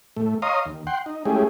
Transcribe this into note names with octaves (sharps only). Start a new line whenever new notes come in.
A2 A3
C#5 D#5 F5 A#5 C6 D#6
D#2
F#5 G5 C6
D#4
G#3 A3 C#4 E4 G4 G#4